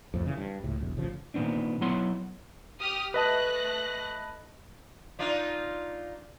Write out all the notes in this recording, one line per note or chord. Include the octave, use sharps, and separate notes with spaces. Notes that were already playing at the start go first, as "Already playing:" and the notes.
F2 A2
C#3 E3
G2
C#2 A2
E1 B1 E2
A1 C#3 F3
A#2 D#3 B3 C4 D4
F#3 B3 E4 C#5 F#5 C6
G4 D#6 F6
A3 B4 D#5 A5 F#6 A#6
D4 D#4 F4